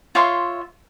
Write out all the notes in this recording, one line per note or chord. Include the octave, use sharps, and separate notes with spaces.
F4 C#5 E5 C6